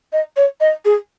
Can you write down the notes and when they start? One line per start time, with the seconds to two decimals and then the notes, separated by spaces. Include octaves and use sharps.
0.13 D#5
0.36 C#5
0.60 D#5
0.85 G#4